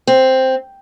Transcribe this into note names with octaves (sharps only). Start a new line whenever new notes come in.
C4